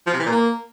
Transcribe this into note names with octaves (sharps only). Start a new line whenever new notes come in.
F3
C3
E3
A#2
A#3